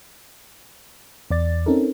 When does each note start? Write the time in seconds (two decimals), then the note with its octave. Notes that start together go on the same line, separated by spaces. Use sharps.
1.31 E2 D5 A6
1.66 C4 C#4 D#4 A4 A#4